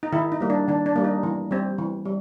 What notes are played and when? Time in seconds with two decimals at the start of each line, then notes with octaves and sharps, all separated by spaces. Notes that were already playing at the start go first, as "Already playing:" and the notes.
0.03 D#4
0.12 D#3 E4
0.32 D#4
0.41 G3 A#3
0.50 D4
0.68 D#3 D4
0.86 D4
0.96 G3 A#3
1.04 D#4
1.23 E3
1.51 G3 C4
1.78 E3
2.05 G3